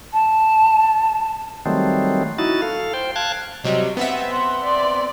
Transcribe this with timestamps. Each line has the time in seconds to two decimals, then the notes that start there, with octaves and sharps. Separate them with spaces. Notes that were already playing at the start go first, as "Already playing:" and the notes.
0.13 A5
1.66 D#3 F#3 G3 A3 C4
2.38 D#4 E4 F#4 A6
2.62 A4 F5
2.94 C5 G5
3.16 F5 A5 F#6 G#6
3.64 C3 F#3 G3 D#5
3.97 B3 C4 E5 F#5
4.31 F#5 C6
4.64 D5